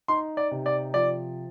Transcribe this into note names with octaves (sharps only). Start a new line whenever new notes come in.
D#4 C6
D5
C3
D5
F3 D5